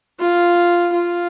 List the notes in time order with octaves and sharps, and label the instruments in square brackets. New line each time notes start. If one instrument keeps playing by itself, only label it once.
[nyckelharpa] F4
F4